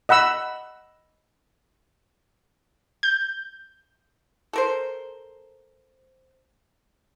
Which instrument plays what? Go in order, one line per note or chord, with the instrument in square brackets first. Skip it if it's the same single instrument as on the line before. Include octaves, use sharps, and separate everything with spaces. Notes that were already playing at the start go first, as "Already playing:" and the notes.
[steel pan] D#5 F#5 B5 E6
[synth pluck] G6
[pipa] A4 A#4 C5